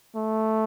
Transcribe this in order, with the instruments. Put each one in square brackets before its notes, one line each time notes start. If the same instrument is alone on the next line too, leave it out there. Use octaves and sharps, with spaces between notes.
[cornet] A3